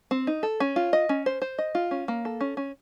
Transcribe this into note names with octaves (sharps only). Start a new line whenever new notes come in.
C4
D#4
A4
C#4
F4
D#5
C#4
C5
C5
D#5
F4
C#4
A#3
A4
C#4
C#4